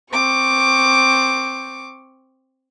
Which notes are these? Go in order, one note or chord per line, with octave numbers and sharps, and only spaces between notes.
C4 C#6 D6